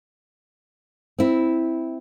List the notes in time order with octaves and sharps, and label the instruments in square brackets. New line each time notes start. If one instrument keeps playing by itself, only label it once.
[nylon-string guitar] C4 E4